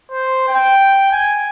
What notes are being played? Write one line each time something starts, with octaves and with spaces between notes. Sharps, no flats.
C5
G5
G#5